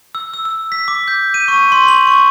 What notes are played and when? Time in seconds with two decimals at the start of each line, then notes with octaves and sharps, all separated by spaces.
0.15 E6
0.34 E6
0.45 E6
0.72 B6
0.88 D6
1.08 G6
1.34 D#7
1.48 C#6
1.72 C6
1.88 F#7
2.07 C#6